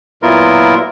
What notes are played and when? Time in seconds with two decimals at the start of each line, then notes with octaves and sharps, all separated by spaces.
0.22 A#2 F#3 B3 E4 F4 A#4